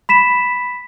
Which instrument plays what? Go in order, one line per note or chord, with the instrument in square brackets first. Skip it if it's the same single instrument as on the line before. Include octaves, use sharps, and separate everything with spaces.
[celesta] B5 B6 E7